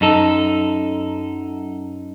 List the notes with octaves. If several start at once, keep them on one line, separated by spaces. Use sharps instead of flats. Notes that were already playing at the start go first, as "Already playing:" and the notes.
F#2 D#4 A4